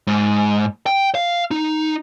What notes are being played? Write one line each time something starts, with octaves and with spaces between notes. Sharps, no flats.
G#2
G5
F5
D#4